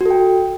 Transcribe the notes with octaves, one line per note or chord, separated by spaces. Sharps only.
F#4 A4 G5